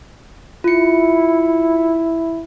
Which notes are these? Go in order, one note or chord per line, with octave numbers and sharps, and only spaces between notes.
E4 F4 C#7